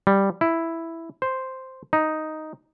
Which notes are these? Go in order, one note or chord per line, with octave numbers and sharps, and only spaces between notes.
G3
E4
C5
D#4